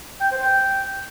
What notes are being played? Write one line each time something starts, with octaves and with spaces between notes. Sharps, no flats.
G5
C5
G5